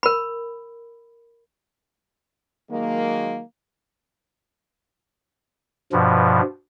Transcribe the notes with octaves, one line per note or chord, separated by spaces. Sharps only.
A#4 B5
D#3 F#3 G#3 A#3
G2 B2 F3